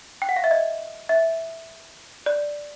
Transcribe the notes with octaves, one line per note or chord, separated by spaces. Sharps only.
G5
F#5
F5
E5
D#5
E5
D5